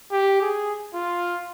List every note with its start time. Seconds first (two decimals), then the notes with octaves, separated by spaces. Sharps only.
0.11 G4
0.41 G#4
0.94 F4